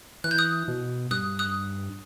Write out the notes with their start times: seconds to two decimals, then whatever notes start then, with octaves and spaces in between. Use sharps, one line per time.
0.24 E3 F#6
0.31 G6
0.38 D#6 F#6
0.68 B2
1.11 G2 D#6 F#6
1.39 D#6 F#6